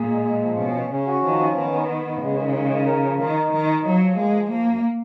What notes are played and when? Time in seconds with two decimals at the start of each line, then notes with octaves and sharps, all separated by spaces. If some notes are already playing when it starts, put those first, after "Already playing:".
Already playing: A#2 G#4
0.09 G#3
0.25 G#3
0.42 F3
0.58 B2 C#4
0.74 C#4
0.90 C#3 C#4
1.07 F#4
1.23 D#3 F3
1.39 C#4
1.56 D#3 B3
1.73 B3
1.88 B3
2.05 B3
2.21 C#3 G#3
2.37 D#3
2.54 G#3
2.70 D#3
2.86 A#4
3.03 F3
3.19 D#3 A#4
3.35 D#4
3.51 D#3 A#4
3.68 D#4
3.84 F3 F#3
4.01 F3
4.16 G#3 A#3
4.33 F3
4.50 F3 A#3
4.66 F#2